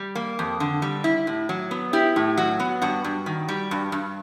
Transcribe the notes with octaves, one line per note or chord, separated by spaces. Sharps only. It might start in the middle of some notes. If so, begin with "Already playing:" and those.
Already playing: G3
A#3
F2
D3
G3
E4
A2
F#3
B3
E4 G4
A2
F#3 F#4
B3
G2 F#4
G2
D#3
G3
G2
G2